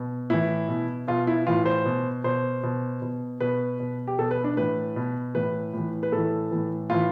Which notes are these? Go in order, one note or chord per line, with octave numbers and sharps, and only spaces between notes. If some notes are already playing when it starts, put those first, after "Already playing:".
Already playing: B2
A2 E3 E4
B2
B2 F4
E4
A2 E3 F4
C5
B2
B2 C5
B2
B2
B2 B4
B2
G4
B2 A4
B4
D4
A2 E3 B4
B2
A2 E3 B4
A2 E3
B4
A2 E3 A4
A2 E3
A2 E3 F4